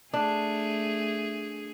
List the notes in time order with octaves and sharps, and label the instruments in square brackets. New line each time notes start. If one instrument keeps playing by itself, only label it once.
[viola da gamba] A3 G#4 [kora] D4